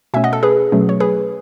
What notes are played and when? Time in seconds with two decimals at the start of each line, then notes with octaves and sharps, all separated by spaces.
0.14 B2 A3 C#4 E5 G#5
0.24 D#5 F#5
0.33 A4
0.43 G#4 B4
0.72 B2 F#3 A3 C#4
0.89 C#5
1.00 G#4 B4